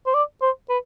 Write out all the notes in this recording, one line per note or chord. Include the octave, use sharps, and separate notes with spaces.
C5
D5
C5
B4